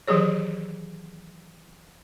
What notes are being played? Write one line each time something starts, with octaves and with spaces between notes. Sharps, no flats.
D#3 E3 F#3 G4 G#4 C#5